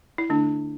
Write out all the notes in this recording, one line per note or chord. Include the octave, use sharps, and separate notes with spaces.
E4
D3 A3 D4